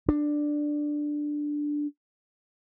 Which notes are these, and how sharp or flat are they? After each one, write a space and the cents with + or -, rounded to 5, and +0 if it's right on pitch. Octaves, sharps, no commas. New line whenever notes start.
D4 +5